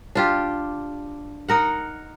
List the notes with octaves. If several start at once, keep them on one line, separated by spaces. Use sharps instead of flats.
D4 F4 G4
D#4 A#4 F#5